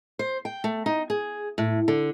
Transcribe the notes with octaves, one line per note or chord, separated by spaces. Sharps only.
C5
G5
A3
D#4
G#4
A2
D3